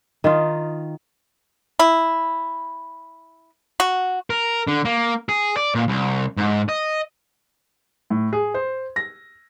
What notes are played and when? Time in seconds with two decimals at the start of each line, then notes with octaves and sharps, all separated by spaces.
0.24 D#3 D#4 F4
1.79 E4
3.80 F#4
4.30 A#4
4.68 D3
4.85 A#3
5.29 G#4
5.57 D5
5.75 A#2
5.88 C2
6.37 G#2
6.69 D#5
8.10 A2
8.33 G#4
8.54 C5
8.96 A#6